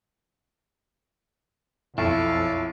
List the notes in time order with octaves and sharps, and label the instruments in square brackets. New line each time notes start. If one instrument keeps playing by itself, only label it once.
[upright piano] B1 [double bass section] F2 [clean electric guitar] E4 [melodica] A4 F5